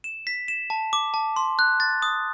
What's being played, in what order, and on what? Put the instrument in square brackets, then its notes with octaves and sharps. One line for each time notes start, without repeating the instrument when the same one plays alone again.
[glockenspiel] E7
B6
E7
A5
D6
A5
C6
F#6
A6
D#6